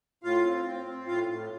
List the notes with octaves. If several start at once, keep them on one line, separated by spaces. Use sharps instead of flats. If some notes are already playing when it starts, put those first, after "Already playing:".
A2 F4 F5
C4
C4
C4
A2 F4 F5
A2